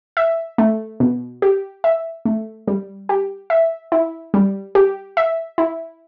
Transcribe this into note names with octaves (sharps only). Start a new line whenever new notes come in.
E5
A3
B2
G4
E5
A3
G3
G4
E5
E4
G3
G4
E5
E4